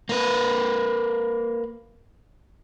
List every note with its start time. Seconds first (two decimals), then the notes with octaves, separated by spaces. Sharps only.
0.09 A#3 B4